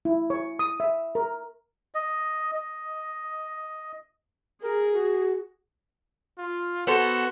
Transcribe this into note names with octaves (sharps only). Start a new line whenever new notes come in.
E4
C#5
D#6
E5
A#4
D#5
D#5
G#4 A#4
F#4
F4
B3 F#4 A4 C5